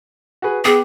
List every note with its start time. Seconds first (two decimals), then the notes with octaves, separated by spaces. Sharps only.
0.42 F#4 G#4 B4
0.65 B3 G#4 G5 D6